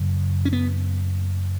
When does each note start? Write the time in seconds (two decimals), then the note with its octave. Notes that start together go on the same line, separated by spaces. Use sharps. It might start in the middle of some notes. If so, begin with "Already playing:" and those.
Already playing: F#1 F#2 C#3
0.45 C#4
0.53 B3